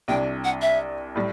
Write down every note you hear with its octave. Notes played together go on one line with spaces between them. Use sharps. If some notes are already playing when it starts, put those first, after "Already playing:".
C2 C3 G3 D4 G5
F#5
E5
A2 G3